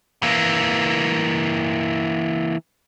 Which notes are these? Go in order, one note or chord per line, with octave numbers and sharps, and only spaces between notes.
E3 A#3